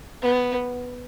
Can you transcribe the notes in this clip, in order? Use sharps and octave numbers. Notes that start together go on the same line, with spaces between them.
B3